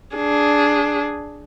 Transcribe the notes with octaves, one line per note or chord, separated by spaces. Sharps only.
D4 G#4